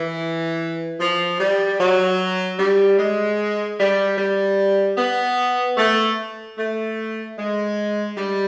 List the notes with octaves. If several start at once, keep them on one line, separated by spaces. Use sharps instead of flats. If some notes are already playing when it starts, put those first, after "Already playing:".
Already playing: E3
F3
G3
F#3
G3
G#3
G3
G3
B3
A3
A3
G#3
G3